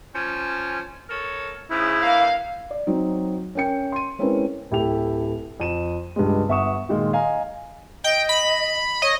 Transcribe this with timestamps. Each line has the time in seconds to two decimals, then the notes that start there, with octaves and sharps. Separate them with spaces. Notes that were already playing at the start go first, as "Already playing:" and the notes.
0.14 F3 C#4
1.08 A4 A#4 C#5
1.70 G#2 C#3 E4
2.02 G2 A#3 F5
2.71 D5
2.87 F#3 C4 D#4
3.55 C#4 A#4 G5 C#7
3.92 C6 D#7
4.19 G#3 C4 C#4 E4 A#4 B4
4.71 D1 E4 G4 A4 G5 F7
5.60 F2 D#7 E7
6.16 C#2 G2 G3 G#3
6.49 G1 E5 F#5 C#6 D#6 E7
6.89 A#2 D#3 G#3 F4
7.13 D#5 F5 G#5 A#5
8.04 D#5 G5
8.29 B5
9.02 C#5 D#5